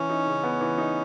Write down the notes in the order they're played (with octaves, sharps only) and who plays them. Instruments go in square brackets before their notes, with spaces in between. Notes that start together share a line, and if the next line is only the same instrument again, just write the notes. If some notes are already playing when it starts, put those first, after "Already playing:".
Already playing: [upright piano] E3 [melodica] C#4
[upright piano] D#4
C#3
B3
E3
D#4